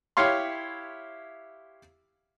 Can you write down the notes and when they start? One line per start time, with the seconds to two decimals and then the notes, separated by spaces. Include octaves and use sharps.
0.17 E4 G4 C#5 F5 C6